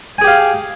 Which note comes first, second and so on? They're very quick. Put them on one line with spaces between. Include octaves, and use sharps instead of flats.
G#5 G#4 G4 F5